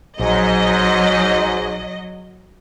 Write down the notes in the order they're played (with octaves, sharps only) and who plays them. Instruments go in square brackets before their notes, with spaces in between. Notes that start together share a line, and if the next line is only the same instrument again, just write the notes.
[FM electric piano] A#1 [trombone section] G#2 [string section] F#3 D#5